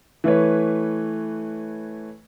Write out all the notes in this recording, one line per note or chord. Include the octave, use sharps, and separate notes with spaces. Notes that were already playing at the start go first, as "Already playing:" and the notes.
E3 A3 B4 C#5